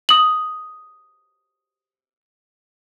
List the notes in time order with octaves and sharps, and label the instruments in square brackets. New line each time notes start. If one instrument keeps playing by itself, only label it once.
[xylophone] D#6 F#7